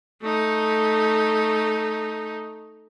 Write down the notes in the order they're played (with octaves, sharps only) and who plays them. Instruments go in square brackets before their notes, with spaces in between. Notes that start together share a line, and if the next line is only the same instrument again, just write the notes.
[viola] A3 D#4